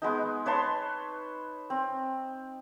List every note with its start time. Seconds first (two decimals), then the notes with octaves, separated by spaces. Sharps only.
0.02 G#3 B3 D#4
0.46 B4 C#5 A5 C6
1.70 C4